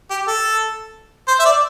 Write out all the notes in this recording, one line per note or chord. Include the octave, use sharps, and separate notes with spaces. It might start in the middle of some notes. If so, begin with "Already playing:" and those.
G4
A4
C5
E5
D5